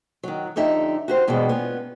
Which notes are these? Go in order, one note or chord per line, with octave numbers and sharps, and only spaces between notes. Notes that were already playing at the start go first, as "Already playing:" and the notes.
D#3 F#3
F2 D3 D#4 G4 E5
F#4 G4 C5
G2 B2 E3 G3 G#3
B3 C#4 F4